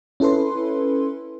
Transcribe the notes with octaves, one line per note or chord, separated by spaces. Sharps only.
C#4 E4 A4 B4 C6